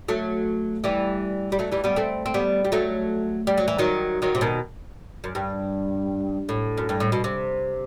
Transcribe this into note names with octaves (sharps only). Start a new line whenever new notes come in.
F#3 A3
E3 G3
G3
F#3 A3
E3 G3
G3 B3
A3 C4
C4
G3 B3
G3
F#3 A3
G3
F#3
E3
D#3 F#3
D#3 F#3
C3
B2 D#3
F#2
G2
A2
F#2
G2
A2
B2
C3